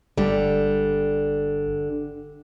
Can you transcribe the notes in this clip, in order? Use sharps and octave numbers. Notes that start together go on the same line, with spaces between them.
G1 D3 G3